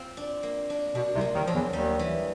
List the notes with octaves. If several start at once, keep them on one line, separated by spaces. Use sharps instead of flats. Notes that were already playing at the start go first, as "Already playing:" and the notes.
Already playing: C4 F4
D4
A#3
D4
B2 D4
C2 C3
A#3
D#2 D#3
F3 F#3
E2 E3
D#2 D#3 G3
E3